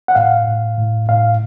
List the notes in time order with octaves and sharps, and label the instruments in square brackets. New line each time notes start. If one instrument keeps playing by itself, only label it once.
[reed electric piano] F#5
A2 F5
A2
A2
A2 F5